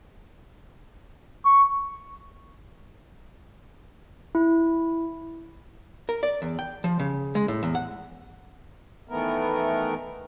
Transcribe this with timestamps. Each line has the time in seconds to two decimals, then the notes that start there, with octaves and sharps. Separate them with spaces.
1.45 C#6
4.35 E4
6.09 A#4
6.23 D5
6.42 E2
6.59 G5
6.84 F3
7.00 C#3
7.35 G#3
7.48 A2
7.63 E2
7.75 F#5
9.09 D#3 E3 A3 B3 A#4